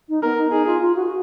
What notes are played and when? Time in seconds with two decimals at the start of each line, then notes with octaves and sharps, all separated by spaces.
0.09 D#4
0.23 B3 A#4
0.38 D#4
0.52 D#4 G#4
0.67 F4
0.81 F4
0.95 F#4
1.06 F#4